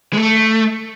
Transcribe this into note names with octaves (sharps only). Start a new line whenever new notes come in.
G#3
A3